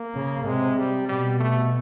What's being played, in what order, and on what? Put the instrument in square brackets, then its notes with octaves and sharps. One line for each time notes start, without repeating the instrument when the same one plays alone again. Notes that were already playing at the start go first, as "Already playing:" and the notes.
Already playing: [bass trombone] A#3
[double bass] C#3
[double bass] C3 [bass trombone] G#3
[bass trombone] G3
[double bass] B2 [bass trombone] G3
[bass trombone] A3